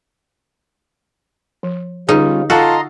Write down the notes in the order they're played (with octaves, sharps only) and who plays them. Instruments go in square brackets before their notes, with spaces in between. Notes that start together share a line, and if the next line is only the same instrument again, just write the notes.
[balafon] F3
[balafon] D3 G#4 [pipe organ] G3 C#4 F4 [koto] D#4
[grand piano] F4 A4 [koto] F#4 [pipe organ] D#5 A#5 C6